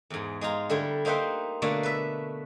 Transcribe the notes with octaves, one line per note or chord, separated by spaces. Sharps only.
E2 G#2
G#3 D#4 F4 A#5
D3 G3 A3 E4
A#3 D#4 C5 E5 F#5 G5
B2 D3 A3 A#3 D5
B4 E5